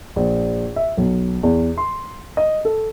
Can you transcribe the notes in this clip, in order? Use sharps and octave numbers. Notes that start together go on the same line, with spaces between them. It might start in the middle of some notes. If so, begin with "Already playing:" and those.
A#1
E5
B1
E2
C6
D#5
A4